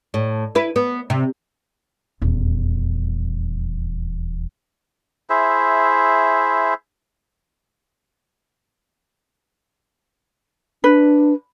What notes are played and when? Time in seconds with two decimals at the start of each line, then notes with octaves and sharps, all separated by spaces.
0.14 A2
0.55 E4 B4
0.76 B3
1.10 C3
2.22 D#1 E2
5.30 E4 G#4 C5 E5
10.84 D4 B4